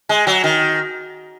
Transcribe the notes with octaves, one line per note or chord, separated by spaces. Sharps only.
G#3
F#3
D#3